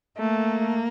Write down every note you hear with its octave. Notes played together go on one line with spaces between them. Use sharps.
A3 A#3